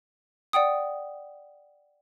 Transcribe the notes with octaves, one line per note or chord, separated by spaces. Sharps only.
D5 F#5 G5 D#6